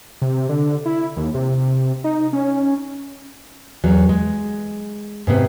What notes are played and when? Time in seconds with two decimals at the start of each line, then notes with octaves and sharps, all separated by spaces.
0.22 C3
0.49 D3
0.85 E4
1.17 D#2
1.35 C3
2.04 D#4
2.33 C#4
3.84 E2 F#3
4.09 G#3
5.27 G#2 C3 B3